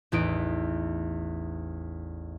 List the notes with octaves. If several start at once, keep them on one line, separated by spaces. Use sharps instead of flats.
A1 E2 D#4 D7